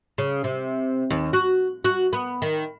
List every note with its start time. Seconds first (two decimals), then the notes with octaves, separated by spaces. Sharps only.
0.18 C#3
0.44 C3
1.11 D#2
1.33 F#4
1.85 F#4
2.13 B3
2.42 D#3